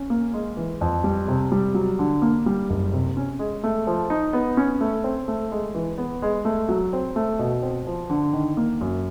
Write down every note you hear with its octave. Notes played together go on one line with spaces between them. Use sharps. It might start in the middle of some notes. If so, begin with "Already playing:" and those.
Already playing: C#4
A#3
G#3
E3
F2
G3
C3
G3
F#3
D3
A#3
G3
F#1
C3
C#4
G#3
A3
F3
D#4
B3
C#4
A3
C4
A3
G#3
E3
B3
G#3
A3
F#3
C4
A3
B2
C4
F3
D3
D#3
A#3
F#2